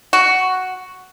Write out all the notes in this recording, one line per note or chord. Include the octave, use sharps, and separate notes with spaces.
F#4